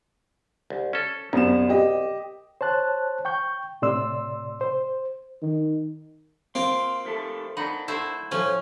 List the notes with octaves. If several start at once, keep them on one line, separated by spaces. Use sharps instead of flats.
C2
C#4 A4
C2 F#2 B3 E7
G4 D#5
C5 C#5 A5 F#6
G5 C#6 G6
A2 C3 D5 C6 E6
C5
D#3
A#3 C4 F4
F3 A3 A4
D#4 D5 F#5 B5
A3 E4 C5
A2 F3 C#4 G#5